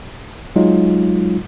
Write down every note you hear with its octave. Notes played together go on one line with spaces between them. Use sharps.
F#3 G#3 D#4 F4